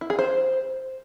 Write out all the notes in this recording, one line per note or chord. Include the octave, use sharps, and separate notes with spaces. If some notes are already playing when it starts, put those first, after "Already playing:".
E4
G#4
C5